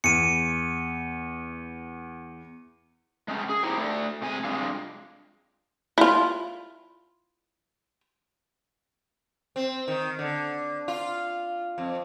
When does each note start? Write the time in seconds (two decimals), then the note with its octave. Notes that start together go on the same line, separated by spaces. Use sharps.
0.04 E2 C#7 D#7
3.28 G#3 A3 C#4
3.49 G#4
3.63 D#4 E4 G4 C5 C#5 G5
3.78 A3 A4 D5
4.22 C3 G#3 G#5
4.44 G2 C3 G#3 D4 F4
5.98 E4 F4
9.56 C4
9.88 D#3
10.19 D3
10.88 F4
11.78 F2